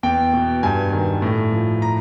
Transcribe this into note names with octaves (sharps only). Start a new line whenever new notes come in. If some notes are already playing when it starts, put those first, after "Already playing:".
E2 G5
B2
G2 G#5
D#3
A2
F3
A#5